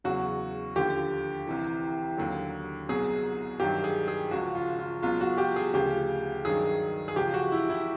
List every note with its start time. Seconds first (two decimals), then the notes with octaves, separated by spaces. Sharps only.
0.04 E2 C#3 F#3 F#4
0.76 D#2 D3 F3 G4
1.47 C2 C3 E3
2.18 D#2 D3 F#3
2.89 C2 B2 F#3 G#4
3.60 G2 D#3 F#3 G4
3.84 G#4
4.08 G#4
4.31 C#2 C#3 F3 F#4
4.55 F4
4.79 F4
5.02 C#2 B2 F#3 F4
5.21 F#4
5.38 G4
5.56 G#4
5.73 D2 C#3 F3 G4
6.45 G2 D#3 F#3 G#4
7.08 G#4
7.16 C#2 C#3 F3 G4
7.34 F#4
7.52 E4
7.69 E4